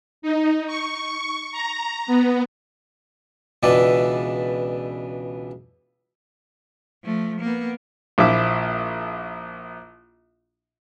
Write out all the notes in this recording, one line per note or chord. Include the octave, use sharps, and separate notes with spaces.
D#4
C#6
C#6
A#5
B3
C#2 B2 E3 D4 D5 E5
F3 A3
A#3 B3
A#1 A#2 F3 E4 E5 D6